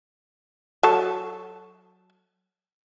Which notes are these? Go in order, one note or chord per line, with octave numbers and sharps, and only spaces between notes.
F#3 A4